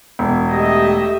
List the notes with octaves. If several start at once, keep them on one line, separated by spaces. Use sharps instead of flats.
E1
A3 G4 D#5 E5